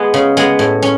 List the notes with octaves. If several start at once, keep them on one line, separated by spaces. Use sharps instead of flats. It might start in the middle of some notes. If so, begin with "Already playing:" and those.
Already playing: G#3 B3
C#3
G#3 B3
A2
C#4